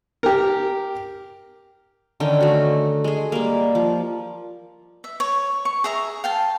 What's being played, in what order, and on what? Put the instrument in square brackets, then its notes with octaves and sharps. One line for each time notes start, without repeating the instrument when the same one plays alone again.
[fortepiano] G4 A#4
[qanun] D3 D#3 C#4 G5
A3 F#4
G#3 G#4
G3 A#3
F3
[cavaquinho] E5
C#5
C#6
G#4 E5 A#5
F5 G5 A5